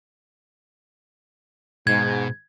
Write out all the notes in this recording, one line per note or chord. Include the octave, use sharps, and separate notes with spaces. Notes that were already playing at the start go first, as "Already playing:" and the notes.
G#2 B2 G#6